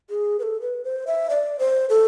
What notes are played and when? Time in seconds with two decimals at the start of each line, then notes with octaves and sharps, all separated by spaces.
0.10 G#4
0.39 B4
0.43 A4
0.61 B4
0.84 C5
1.07 E5
1.30 D5
1.59 C5
1.90 A4